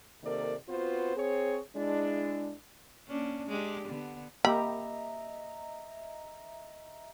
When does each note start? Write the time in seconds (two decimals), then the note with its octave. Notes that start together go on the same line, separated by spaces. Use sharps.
0.24 C3 D#3 A#3 A4 A#4 D5
0.68 B3 C4 F4 F#4 B4 C5
1.17 C4 G#4 C#5
1.76 G#3 D4 E4
3.08 A#3 C#4 D4
3.47 G#3 D4 G4
3.88 D3 B3
4.45 A#3 G4 D#5 E5 A#5 B5